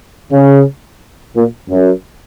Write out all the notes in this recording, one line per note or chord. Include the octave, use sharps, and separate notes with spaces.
C#3
A#2
F#2